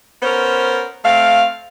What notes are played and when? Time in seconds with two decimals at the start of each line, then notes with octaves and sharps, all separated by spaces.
0.22 B3 C#4 A#4 C5
1.05 A3 C4 F5